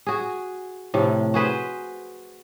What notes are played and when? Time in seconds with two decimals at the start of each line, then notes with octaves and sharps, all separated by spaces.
0.06 F#4 G#4
0.94 A2 C3 F3
1.34 F#4 G#4 B4 C5